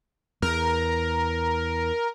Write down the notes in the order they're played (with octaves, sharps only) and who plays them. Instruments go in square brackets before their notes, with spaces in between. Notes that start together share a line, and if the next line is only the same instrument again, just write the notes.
[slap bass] E2 [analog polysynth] A#4